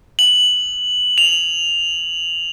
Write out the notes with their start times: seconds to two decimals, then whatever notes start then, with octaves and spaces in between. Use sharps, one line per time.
0.19 F#7
1.18 F7